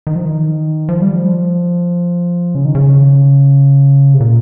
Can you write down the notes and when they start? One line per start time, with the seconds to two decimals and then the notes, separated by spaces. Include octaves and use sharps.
0.07 D#3
0.15 F3
0.25 D#3
0.89 F3
1.02 G3
1.16 F3
2.55 C#3
2.65 D#3
2.75 C#3
4.14 C3
4.20 A#2